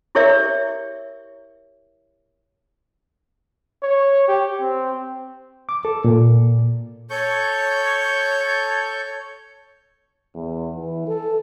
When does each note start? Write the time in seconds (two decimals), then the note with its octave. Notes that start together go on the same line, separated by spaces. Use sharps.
0.15 E4 G4 A#4 C#5 D5 E5
3.83 C#5
4.28 G4
4.60 C4
5.69 D6
5.85 A4
6.05 A#2
7.10 A4 C#5 C#6 G6
10.35 E2
10.75 E3
11.07 A4